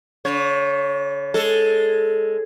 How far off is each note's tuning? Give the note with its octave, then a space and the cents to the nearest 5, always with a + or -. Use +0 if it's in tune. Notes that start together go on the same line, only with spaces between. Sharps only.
D3 -45 C#5 +0
G#3 +0 A4 +0